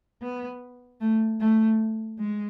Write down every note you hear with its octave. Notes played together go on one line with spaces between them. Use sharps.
B3
A3
A3
G#3